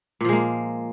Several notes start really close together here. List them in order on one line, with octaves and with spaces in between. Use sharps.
A#2 F3 G#3 A#3